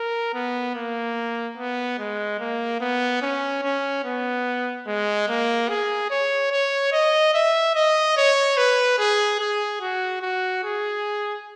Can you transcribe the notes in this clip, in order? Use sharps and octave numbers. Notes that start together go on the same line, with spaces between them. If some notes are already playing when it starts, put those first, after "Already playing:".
Already playing: A#4
B3
A#3
B3
G#3
A#3
B3
C#4
C#4
B3
G#3
A#3
G#4
C#5
C#5
D#5
E5
D#5
C#5
B4
G#4
G#4
F#4
F#4
G#4